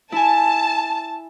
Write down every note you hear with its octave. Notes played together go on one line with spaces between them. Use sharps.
E4 G#5 A5